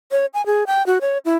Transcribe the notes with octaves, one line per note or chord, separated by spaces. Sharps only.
C#5
G#5
G#4
G5
F#4
C#5
E4